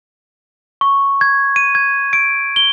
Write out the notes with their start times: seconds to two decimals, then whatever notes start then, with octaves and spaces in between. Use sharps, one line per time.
0.81 C#6
1.21 G#6
1.56 D#7
1.75 G#6
2.13 D7
2.56 G7